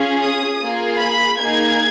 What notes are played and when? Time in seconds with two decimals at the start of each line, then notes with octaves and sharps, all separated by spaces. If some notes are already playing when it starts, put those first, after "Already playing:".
Already playing: C#4 F4 G#4
0.22 D#6
0.61 A#3 F4 G#4
1.00 B5
1.39 A#3 D#4 G#4 G#6